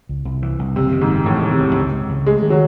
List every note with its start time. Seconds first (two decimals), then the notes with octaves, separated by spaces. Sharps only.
0.09 C#2
0.25 C2
0.42 E3
0.59 C2
0.76 F#1 C3
0.92 D#3
1.01 G#2
1.09 F#1
1.25 E1 A2
1.42 D#3
1.50 C3
1.60 E1
1.75 C#2
1.92 G#3
2.09 C#2
2.26 G#3 A3
2.42 D#3
2.50 F#3